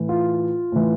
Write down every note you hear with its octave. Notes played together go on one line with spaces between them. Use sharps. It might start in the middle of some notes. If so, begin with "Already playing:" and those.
Already playing: A2 E3
F4
A2 E3